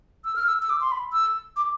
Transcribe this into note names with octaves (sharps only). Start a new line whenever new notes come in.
E6
F6
E6
E6
D6
C6
B5
E6
D6